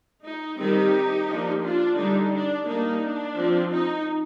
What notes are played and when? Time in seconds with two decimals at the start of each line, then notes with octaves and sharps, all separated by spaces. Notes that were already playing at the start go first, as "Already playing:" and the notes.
0.23 D#4
0.57 D#3 G3 C4 D#4 G4
1.27 F3 A#3 D4
1.62 D4 F4
1.96 D3 G3 D4 D#4
2.32 D4
2.66 G3 A#3 D4 D#4
3.00 D4
3.36 F3 C4
3.70 D#4